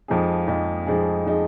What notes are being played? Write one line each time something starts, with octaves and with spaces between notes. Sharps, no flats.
F2 F3 G#3 D#4 G#4
F2 F3 G#3 D#4 G#4
F2 F3 G#3 D#4 G#4
F3 G#3 D#4 G#4